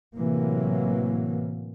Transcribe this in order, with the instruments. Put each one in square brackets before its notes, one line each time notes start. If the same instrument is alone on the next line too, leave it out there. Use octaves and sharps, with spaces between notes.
[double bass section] A2 C3 E3 F#3 A#3